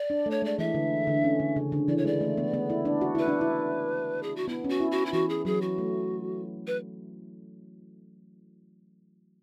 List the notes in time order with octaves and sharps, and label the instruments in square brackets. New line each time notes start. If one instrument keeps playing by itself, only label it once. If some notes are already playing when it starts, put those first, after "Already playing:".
Already playing: [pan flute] D5
[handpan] D4
A3
[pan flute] C#5
[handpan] G#3
[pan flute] D5
[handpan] E3 [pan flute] E5
[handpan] D3
D3
C#4
D3
C#3
D3
[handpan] E3 [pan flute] D5
[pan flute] C#5
[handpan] G#3 [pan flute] D5
[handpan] A3
B3
B3
E4
D4
F#4
[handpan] E4 [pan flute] B4
[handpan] D4
E4
[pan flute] G#4
F#4
[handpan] B3 [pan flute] E4
[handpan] C#4
[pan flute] F#4
[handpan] E4
[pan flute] F#4
E4
[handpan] E3 [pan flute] F#4
[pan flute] G#4
[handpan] F#3 [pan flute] G#4
[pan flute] F#4
[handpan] A3
[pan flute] B4